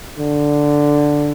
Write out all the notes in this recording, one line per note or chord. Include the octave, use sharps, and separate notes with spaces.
D3